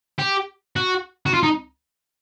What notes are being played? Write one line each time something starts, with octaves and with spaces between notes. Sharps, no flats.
G4
F#4
F#4
F4
D#4